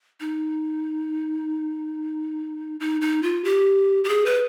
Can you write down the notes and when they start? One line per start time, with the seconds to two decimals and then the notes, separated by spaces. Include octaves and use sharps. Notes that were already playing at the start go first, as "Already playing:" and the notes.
0.20 D#4
2.80 D#4
3.01 D#4
3.23 F4
3.44 G4
4.04 G4
4.09 G#4
4.26 B4